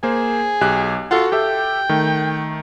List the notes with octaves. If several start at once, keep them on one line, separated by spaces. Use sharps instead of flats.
A#3 G#4 C5
B1 G4 F#6
F4 F#4 A4 F#5
G4 A4 E5 G5
D#3 A3